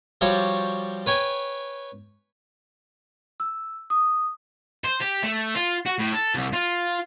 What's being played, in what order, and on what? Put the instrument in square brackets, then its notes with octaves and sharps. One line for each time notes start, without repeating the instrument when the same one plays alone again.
[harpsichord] F3 G3 F#4 C#5 D5
B4 C#5 G5 G#5
[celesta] E6
D#6
[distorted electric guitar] C5
G4
A3
F4
F#4
A2
A4
C2
F4